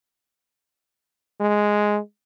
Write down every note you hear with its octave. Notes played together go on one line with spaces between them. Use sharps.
G#3